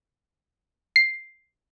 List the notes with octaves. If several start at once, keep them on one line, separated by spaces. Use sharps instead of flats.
C7